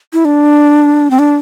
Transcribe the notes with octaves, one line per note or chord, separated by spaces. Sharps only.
E4
D4
C4
D4